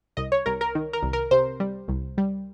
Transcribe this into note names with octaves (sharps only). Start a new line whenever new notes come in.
C2 D#5
C#5
C2 A#4
A#4
D#3
A#4
C2
A#4
C3 C5
G3
C2
G3